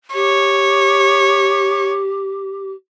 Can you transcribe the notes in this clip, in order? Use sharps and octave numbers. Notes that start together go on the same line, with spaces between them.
G4 C#5